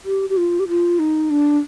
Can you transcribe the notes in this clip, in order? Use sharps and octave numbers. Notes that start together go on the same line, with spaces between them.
G4
G4
F4
G4
F4
D#4
D4